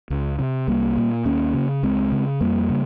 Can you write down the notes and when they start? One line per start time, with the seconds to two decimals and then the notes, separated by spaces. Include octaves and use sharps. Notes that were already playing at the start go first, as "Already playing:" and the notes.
0.10 C#2
0.39 C3
0.68 C2 G3 A#3
0.97 A#2
1.25 D#2 A#3 C#4
1.54 C#3
1.83 C#2 G#3 C4
2.12 C#3
2.41 F2 G3 A#3
2.70 C#3